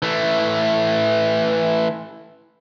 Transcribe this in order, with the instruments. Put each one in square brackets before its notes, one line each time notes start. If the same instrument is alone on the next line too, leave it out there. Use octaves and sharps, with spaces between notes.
[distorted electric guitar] E3 A3